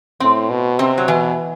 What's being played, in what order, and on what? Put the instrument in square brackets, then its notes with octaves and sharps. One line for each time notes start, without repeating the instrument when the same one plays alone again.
[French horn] A2 [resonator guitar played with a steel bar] C4
[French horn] B2
[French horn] C3 [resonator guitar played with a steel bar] C4
[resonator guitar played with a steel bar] F#3
[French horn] B2 [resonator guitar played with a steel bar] E3